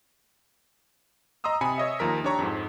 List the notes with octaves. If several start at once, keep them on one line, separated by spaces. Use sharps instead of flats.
D#5 A#5 C6 D#6 E6
C3 G#5 B5 C#7
C#5 D#5 E5
D#2 F3 A#4 B6
D4 G4 C#5 A#5 C#6
F2 G#2